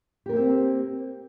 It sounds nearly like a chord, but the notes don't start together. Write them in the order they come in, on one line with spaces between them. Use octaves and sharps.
G4 A#4 A#3 C4